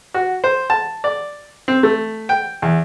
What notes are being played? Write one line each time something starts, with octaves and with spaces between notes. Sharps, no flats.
F#4
C5
A5
D5
C4
A3
G5
E2